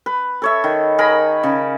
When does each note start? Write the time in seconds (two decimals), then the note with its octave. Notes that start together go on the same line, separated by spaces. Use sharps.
0.06 B4
0.42 A4 C#5 E5
0.64 D#3
0.98 G#4 A#4 A#5 B5
1.43 C#3